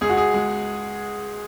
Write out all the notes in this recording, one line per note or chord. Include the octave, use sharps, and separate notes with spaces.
C#2 G#4
F#4
G#4
G#3